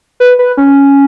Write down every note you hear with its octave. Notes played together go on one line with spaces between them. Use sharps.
B4
B4
C#4